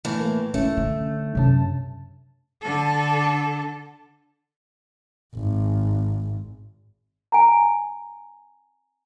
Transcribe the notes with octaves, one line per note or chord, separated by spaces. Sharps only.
A2 E3
A3 A#3
A1 A3 C#4
D3
F#2 C3 C#4 D4 A5
D3 A4
G#1
G#5 A#5